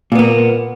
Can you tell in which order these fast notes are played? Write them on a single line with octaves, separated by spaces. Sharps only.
A#2 B3 A#3